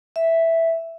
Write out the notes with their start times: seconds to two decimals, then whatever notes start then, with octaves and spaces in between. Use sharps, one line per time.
0.16 E5